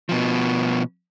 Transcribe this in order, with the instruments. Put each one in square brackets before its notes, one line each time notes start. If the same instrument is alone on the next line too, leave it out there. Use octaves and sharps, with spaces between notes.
[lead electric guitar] B2 F3